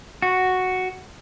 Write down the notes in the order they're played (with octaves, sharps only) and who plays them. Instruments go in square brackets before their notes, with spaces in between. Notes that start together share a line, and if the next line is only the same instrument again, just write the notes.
[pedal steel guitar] F#4